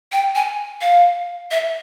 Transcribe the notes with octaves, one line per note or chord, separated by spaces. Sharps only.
G5
G#5
F5
E5